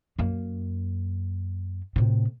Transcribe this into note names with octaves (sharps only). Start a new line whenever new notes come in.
F#2 A#3
A2 C3